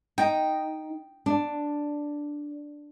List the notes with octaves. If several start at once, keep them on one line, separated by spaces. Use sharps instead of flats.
D#4 G5
D4